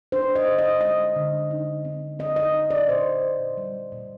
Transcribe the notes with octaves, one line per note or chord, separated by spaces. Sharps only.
D4 C5
D#5
D3
D#5
G#3 D#5
D3
D#4
C4
C4 D#5
D#5
D#4
D5
A#2 C5
A#2
G3
A#2